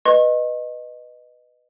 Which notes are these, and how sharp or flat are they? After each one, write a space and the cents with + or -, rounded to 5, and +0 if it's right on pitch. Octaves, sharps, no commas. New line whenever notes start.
B4 +0 D#5 -15 C#6 -45